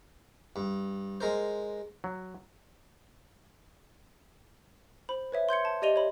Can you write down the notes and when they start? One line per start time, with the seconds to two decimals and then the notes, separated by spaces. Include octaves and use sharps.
0.56 G2
1.21 G#3 A#4 C5
2.04 F#3
5.09 C5 B5
5.32 B4 C#5 E5
5.49 C6 G6 G#6 C#7
5.65 A5
5.82 G4 D5 D#5 D#7 F7 G7
5.96 C#5 B5